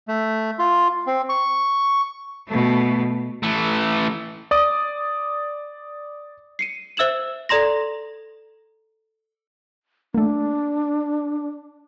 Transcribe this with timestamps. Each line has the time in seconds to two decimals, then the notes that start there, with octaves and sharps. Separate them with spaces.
0.08 A3
0.59 F4
1.07 C4
1.29 C#6
2.47 B2 A3
3.43 E3 A3
4.51 D5 D#6
6.59 C7 C#7 D#7
6.97 C5 E5 E6 G#6 E7 F#7
7.49 A4 D5 A#5 C6 A#6
10.14 A3 A#3 D4